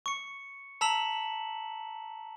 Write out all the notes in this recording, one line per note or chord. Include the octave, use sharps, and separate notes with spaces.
C#6 C#7
A5 A#5 E6 B6 E7 F#7